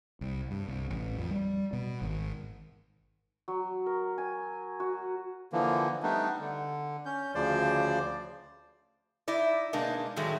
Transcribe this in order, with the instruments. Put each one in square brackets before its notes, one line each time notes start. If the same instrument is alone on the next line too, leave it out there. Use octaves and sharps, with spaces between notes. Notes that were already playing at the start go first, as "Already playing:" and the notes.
[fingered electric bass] C2
G2
C2
A1
F2
G3
B2
G#1
[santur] F#3
A#4
G#5
F#4
[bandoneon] D3 E3 F3 A#3
G3 A3 B3 D4 D#4
D3
C#4 G6
D2 C#3 F3 C5 D5
[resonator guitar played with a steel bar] D#4 E4 D5
B2 G#3 A#3 D4 D#4
A2 D#3 F#3 G#3 A3